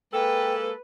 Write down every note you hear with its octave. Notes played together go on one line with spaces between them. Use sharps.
G#3 A#3 A4 B4 G5